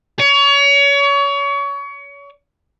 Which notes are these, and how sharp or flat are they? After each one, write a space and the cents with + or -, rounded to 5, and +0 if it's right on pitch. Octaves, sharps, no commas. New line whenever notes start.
C#5 +30